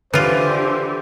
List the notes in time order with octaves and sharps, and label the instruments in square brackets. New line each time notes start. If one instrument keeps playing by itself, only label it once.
[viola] D3 G4 [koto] E3 F4 [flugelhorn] C5